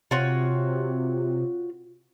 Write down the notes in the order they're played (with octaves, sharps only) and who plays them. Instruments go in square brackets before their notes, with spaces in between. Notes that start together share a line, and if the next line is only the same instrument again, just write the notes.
[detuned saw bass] C3 [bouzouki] F4 F#4 C#5